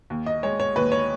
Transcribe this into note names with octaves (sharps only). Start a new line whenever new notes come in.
D#2
D#5
G#3 C#5
C#5
D#2 B4
C#5